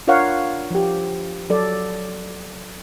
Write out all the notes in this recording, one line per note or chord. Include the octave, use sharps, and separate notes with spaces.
D4 F4 A#4 C#5 F5 F#5
F3 G4
F#3 A4 D5